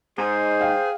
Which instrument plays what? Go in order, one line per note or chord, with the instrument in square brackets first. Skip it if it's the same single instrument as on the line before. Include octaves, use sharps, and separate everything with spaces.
[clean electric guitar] G#2 G#3 D#4 [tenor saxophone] G#4 [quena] C5
[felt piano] F5 G5